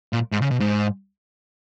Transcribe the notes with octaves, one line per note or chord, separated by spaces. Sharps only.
A#2
G#2
C#3
B2
G#2